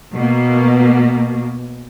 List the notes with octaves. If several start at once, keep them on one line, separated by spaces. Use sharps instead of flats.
B2 A#3